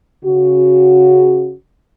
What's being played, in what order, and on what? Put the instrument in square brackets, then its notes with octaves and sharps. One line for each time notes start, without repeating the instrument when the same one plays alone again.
[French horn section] C#3 F#4